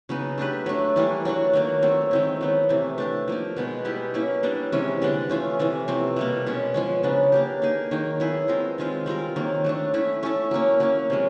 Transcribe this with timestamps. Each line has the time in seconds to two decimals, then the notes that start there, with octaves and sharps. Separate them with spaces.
0.09 C#3 F#3 B3 D#4
0.38 A3 D4 G4 B4
0.66 F#3 A3 D4
0.96 E3 G3 A#3 D4
1.25 F#3 A3 D4 F#4
1.53 D#3 F#3 A#3
1.82 F#3 A3 C4
2.11 D#3 G#3 C4 E4
2.41 F#3 B3 D#4
2.69 C3 E3 A3
2.98 A3 D4 G4
3.28 F3 A#3 D#4
3.57 B2 G#3 B3 D#4
3.85 G3 B3 E4 G4
4.14 F#3 A#3 C#4 E4
4.43 G3 B3 D4
4.72 C3 E3 G#3 C#4
5.02 D3 G3 B3 D4
5.29 E3 A3 C#4 F4
5.59 C3 E3 A3
5.88 C3 F3 A3 C4
6.16 B2 G3 A#3
6.46 B2 G#3 C#4
6.74 F3 G#3 C#4
7.03 C#3 F#3 B3 D4
7.32 A#3 D4 G4
7.62 A#3 D#4 G#4
7.91 D#3 F#3 A#3 D#4
8.20 F#3 B3 E4 G#4
8.48 G#3 C4 F4 A#4
8.78 D#3 G#3 C4 F4
9.06 G3 C4 F4 A#4
9.36 D#3 F#3 A#3
9.64 F#3 A3 D4
9.94 A3 C#4 E4
10.23 A3 C#4 E4 A4
10.51 F#3 A#3 C#4
10.80 F#3 A#3 C#4
11.10 C3 F3 G#3